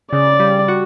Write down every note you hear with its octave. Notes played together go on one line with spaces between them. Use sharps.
C#3 D5
G3
F#4